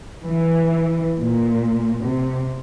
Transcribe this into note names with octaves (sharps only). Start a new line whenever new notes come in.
E3
A#2
C3